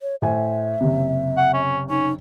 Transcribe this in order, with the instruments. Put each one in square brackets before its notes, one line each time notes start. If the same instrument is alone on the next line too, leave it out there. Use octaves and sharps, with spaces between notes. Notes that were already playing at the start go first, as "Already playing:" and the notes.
[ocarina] C#5
[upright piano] A2 C5 G#5 [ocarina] E5
[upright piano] F#1 C3
[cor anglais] F#5
C#4
[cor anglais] C#4 [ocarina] D#4